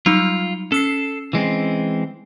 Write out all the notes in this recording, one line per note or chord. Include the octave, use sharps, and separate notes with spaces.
F#3 G3 D#4 F4
C#4 A4 E6 C7
E3 G#3 C4